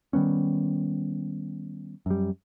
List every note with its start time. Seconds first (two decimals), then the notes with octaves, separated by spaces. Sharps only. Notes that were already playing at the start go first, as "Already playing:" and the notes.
0.13 D#3 G3 B3 C#4
2.06 F#2 G3